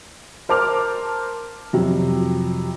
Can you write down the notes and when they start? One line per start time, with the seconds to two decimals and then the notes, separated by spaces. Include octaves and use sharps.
0.49 A#4 C5 A5 D6 F6
1.73 F2 C3 F#3